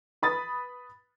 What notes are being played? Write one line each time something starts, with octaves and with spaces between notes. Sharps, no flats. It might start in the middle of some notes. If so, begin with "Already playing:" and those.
B4 B5 D#6 A6